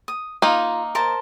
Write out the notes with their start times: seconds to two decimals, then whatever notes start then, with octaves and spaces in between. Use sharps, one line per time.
0.08 D#6
0.42 A#3 D#4 F4
0.95 A#4 C5 A5